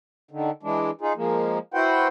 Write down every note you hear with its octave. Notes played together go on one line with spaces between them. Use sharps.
D3 D#3
E3 G#3 D4
D#4 F4 G#4
F3 G#3 A#3
E4 F#4 B4 C5 F#5 G5